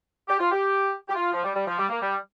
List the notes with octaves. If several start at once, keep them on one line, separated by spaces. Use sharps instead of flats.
G4
F4
G4
G4
F4
F3
G3
G3
F3
G3
A#3
G3